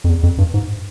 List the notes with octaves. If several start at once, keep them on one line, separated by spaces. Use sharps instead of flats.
F2
E2
F2
G2
G#2